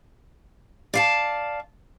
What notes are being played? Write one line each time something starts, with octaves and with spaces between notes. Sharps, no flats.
D5 F5 A5